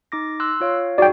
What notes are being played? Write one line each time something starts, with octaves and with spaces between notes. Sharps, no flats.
D#4 D6 A#6
C6 E6 F#6
F4 C#5 F5
D#4 F#4 G#4 D5 G5